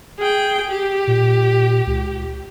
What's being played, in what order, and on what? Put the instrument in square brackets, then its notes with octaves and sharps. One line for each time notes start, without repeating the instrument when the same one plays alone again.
[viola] G#4 G5
G4
[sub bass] A#2
C#2